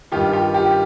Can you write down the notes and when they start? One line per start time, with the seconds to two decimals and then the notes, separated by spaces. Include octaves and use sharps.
0.12 G2 D#3 F4 G4
0.33 F4 G4
0.54 F4 G4